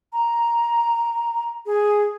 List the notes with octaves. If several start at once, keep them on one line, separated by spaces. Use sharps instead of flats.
A#5
G#4